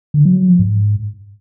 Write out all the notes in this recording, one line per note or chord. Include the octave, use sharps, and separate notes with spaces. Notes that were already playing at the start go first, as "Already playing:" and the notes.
D3
F#3
F#3
F3
G#2